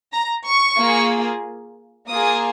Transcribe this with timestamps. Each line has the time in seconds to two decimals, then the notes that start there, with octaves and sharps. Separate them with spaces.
0.13 A#5
0.46 C#6
0.78 A#3 F4 G#4
2.09 A#3 F4 G#4 D#6